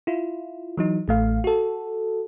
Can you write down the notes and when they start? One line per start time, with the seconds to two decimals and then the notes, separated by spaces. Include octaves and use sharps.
0.07 E4 F4
0.78 E3 F#3 D#4
1.08 A1 A3 F5
1.44 F#4 A4